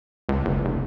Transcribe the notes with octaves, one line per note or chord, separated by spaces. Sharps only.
C#2
F#1
F1